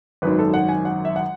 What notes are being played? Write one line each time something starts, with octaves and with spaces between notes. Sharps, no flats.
G#1 F#2 D#3 B4
A4
F#5
G#5
F#5
E5
F#5